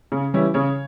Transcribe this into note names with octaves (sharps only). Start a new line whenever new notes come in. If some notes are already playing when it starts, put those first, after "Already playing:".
C#3
E3 G3 C#4 E4
C#3 C#5